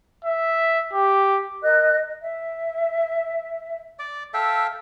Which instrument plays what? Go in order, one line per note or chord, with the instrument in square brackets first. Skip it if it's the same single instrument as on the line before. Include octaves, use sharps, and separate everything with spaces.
[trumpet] E5
G4
[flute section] A#4 D#5 F#6
E5
[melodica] D5 D6
A4 E5 F5 G5